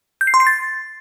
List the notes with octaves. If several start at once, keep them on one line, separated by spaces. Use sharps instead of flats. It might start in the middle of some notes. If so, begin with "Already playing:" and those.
G6
C7
C6
C7
A6